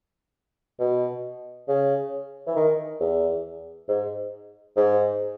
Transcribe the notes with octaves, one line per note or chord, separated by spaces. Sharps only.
B2
C#3
E3
D#3
E2
G#2
G#2